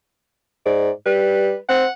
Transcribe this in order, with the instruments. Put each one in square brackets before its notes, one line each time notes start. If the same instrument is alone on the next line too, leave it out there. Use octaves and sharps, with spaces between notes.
[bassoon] G#2 [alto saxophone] D5
[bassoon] G3 [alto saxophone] B4
[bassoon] C4 [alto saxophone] F#5